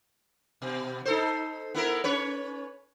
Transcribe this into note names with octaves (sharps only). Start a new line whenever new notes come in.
B2
D#4 A4 C5
B3 E4 A#4
C#4 B4 C#5